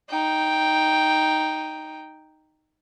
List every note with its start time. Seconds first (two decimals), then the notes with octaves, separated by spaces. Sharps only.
0.10 D#4 G5